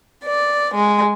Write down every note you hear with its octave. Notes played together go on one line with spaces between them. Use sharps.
D5
G#3